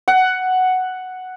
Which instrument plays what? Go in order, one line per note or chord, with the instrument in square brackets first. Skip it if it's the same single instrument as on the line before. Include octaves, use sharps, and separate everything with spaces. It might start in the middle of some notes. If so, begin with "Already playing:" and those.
[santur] F#5